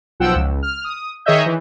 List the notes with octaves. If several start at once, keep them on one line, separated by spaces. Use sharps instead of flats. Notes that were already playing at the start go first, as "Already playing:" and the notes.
B1 F3 F#5 G5 E6
C#2
F6
D#6
D#3 G#4 C#5 D#5 E5 G6
E3